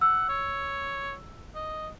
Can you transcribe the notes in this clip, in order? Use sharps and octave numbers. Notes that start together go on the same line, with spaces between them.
F#5 E6
C#5
D#5